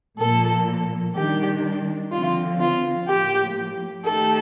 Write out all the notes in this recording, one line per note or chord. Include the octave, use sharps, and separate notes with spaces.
A#2 F3 A#3 A4
D#3 G3 D4 G4
D3 F3 C4 F4
F4
A2 F3 A#3 G4
D#3 A3 D#4 G4 A4